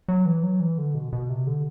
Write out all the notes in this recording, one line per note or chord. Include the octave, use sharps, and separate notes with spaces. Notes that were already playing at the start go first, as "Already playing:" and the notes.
F#3
E3
F#3
E3
D3
B2
B2
C3
D3